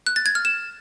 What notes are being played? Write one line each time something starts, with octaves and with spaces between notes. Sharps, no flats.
F#6
A6
G#6
F6
E7